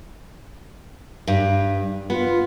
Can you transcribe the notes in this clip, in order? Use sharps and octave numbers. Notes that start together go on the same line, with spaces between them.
G2
B3 F4